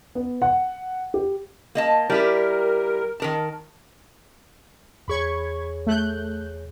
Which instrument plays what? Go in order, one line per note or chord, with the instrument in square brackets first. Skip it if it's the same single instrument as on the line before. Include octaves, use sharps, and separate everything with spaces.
[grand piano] B3
F#5
G4
[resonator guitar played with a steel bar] A#3 D#5 A5
[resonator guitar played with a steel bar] G3 E4 G4 [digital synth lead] A#4
[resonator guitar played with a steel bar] D#3 A#4 A5
[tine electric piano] E2 G#4 C#5 [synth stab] B5 C#6 G#6
[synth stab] A3 F#6 G6